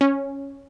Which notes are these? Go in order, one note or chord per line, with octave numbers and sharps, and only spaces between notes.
C#4